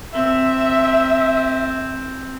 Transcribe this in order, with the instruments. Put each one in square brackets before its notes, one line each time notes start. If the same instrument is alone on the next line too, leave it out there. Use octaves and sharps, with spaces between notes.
[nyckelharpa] C4 [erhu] E5